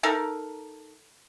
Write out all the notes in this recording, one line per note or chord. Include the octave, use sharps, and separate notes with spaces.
D#4 A4 A#4